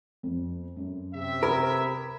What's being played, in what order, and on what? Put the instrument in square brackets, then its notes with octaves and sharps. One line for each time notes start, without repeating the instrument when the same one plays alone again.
[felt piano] F2
F#2
[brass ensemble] C3 E5
[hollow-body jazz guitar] A#4 [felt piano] B5 D#6 G#6